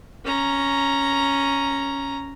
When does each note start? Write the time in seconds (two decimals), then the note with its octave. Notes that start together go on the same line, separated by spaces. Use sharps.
0.25 C#4 A#5